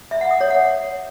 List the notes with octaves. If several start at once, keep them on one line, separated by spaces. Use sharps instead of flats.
E5
F#5
D#6
C#5
F#5